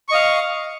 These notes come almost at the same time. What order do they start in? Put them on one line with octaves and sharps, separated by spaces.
C#6 D#5 F5